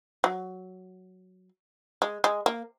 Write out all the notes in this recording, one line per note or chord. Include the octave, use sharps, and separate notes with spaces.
F#3
G#3
G#3
A#3